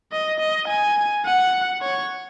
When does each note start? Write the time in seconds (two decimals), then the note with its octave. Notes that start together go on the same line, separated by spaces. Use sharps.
0.12 D#5
0.40 D#5
0.68 G#5
1.25 F#5
1.82 C#5